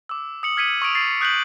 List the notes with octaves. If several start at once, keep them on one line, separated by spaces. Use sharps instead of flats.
D6 E6
D#6 C#7 F#7
F6 G#6 B6 C#7 D#7 F#7
C#6 D#6 D7 F7
A6 C7
D#6 F#6 G6 B6 C#7 F#7